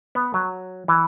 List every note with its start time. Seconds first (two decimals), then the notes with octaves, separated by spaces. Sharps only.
0.15 B3
0.34 F#3
0.88 E3